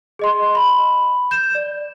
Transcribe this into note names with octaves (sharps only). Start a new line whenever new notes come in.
G#4 D#5 C6
B5
G6 E7
D5